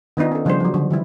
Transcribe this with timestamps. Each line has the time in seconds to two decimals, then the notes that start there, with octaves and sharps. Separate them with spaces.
0.17 D#3 B3 D4 D#4 F4
0.32 C#4 A4
0.45 C#3 F3 G3 D4 G#4 C5
0.60 F3 F#3
0.74 D3
0.91 E3 G3 E4